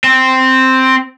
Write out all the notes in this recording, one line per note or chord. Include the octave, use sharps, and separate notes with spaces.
C4